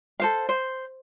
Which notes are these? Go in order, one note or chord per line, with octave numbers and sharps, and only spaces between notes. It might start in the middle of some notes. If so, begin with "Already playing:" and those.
A4 C5 F5
C5